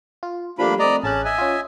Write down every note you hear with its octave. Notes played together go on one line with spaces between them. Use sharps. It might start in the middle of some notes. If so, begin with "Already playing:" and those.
F4
F3 G3 A3 A#3 D4 B5
A3 C4 D5 D#5 A#5
A1 C#4 G#4 A5 F#6
D#5 E5 G#5
C#4 F4